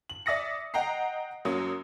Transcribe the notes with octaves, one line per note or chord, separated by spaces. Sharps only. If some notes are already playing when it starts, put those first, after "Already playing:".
F#7
D5 E5 D#6 A#6 C#7
D#5 F#5 G5 A#5 C7
F#2 F#3 A#3 D#6